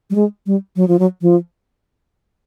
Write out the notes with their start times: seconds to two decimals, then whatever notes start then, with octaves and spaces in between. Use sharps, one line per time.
0.10 G3
0.15 G#3
0.46 G3
0.76 F#3
0.88 F3
0.99 F#3
1.22 F3